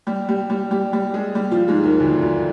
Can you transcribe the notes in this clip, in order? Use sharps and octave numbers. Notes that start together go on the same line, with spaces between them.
G3 G4
G3 G4
G3 G4
G3 G4
G3 G4
G#3 G#4
G3 G4
F3 F4
G#2 G#3
D#2 D#3
D2 D3
D2 D3